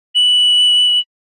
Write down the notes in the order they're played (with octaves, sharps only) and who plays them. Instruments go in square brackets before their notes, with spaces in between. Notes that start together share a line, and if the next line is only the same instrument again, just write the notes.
[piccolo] F#7